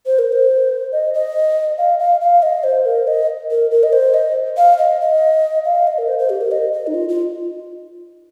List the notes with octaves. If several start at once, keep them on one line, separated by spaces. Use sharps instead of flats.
C5
A#4
C5
D#5
D#5
F5
F5
F5
D#5
C5
A#4
D#5
A#4
A#4
D#5
C5
D#5
F5
D#5
D#5
F5
D#5
A#4
C5
C5
G4
A#4
D#5
D#5
D#4
F4
F4